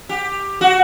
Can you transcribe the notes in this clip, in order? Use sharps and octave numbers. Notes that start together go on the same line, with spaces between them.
G4
F#4